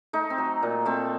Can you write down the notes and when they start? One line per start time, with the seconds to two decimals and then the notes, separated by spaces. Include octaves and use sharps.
0.13 A3 D#4
0.30 C4
0.38 F#3
0.63 A#2
0.85 A3 C4